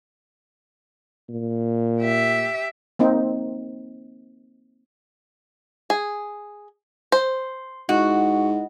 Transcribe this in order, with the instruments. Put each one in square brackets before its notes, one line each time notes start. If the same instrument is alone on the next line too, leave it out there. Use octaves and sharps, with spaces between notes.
[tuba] A#2
[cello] G4 E5
[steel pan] A#3 C4 D#4
[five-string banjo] G#4
[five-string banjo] C5 [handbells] C6
[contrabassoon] G#2 [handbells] E4 D#5 [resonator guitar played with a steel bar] F#4